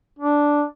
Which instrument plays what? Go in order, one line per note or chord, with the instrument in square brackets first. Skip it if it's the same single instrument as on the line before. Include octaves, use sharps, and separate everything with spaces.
[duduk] D4